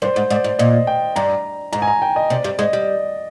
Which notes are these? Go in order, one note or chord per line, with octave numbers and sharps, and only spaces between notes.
G2 C5
G#2
G#2 D5
G#2
A#2 D#5
G5
G2 A#5
G#2 A#5
G#5
A#5
G5
D#5
C3 D5
G2 G3
G#2 G#3 D#5
G3